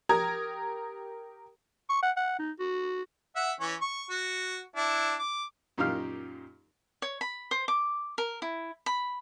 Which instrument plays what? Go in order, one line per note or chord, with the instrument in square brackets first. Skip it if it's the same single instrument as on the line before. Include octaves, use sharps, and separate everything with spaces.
[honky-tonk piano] G4 A#4 A#5 D#6 G#6
[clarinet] C#6
F#5
F#5
D#4
F#4
[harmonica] E5 F#5
E3 C#4 C#5
C#6
F#4
D4 E4
D6
[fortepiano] F#2 A#2 D#4 G4 F5 F6
[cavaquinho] C#5
B5
C5
D6
A#4
E4
B5